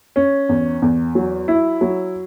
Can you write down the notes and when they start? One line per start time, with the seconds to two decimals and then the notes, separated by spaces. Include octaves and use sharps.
0.16 C#4
0.49 E2
0.82 E2
1.15 F#3
1.48 E4
1.81 F#3